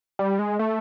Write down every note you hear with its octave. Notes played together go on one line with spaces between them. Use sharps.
G3
G#3
A3